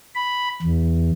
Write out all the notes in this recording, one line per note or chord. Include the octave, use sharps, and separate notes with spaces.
B5
E2